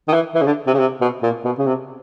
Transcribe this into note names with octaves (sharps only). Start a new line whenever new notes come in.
D#3
E3
E3
C#3
D3
C3
C#3
C3
B2
A#2
B2
C#3
C3